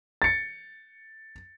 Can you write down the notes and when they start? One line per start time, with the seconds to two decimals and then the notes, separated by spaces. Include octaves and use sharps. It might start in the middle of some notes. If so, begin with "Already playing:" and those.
0.22 A6 C#7